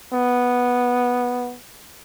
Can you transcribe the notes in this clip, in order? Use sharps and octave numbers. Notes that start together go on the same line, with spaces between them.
B3